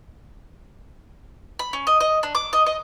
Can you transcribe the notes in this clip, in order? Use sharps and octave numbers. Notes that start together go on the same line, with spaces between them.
B5
C#4
D#5
D#5
D4
D6
D#5
D#5